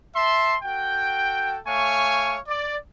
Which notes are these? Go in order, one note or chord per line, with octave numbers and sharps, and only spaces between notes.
E5 A5 C6
F#4 A4 G5
A3 C#5 F5 G#5 C#6
D5